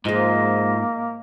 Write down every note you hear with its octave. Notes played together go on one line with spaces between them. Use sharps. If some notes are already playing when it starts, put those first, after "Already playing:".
G#2 F3 G#3 A#3 D#5